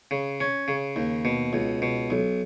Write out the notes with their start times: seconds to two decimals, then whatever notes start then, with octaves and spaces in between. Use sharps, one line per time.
0.11 C#3
0.40 C#4
0.68 C#3
0.96 D#2
1.25 B2
1.53 C#2
1.82 B2
2.10 B1